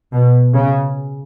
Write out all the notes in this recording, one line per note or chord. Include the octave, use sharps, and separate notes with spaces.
B2
C#3